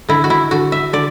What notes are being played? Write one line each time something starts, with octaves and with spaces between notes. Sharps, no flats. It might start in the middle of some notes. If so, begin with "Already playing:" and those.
D3 E4
F#4
E4
D3 F#4
E5
D3 D5